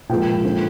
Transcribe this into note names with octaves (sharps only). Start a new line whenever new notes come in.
A#2 F3 G#3 G5
D3 F3 C4